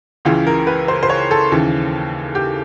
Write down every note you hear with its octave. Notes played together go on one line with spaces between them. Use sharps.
C#2 C#3 E3 F4
A#4
B4
C5
C5
C#5
A4
D#2 C#3 E3
G4